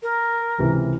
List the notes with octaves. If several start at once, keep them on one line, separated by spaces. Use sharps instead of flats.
A#4
C#2 C3 E3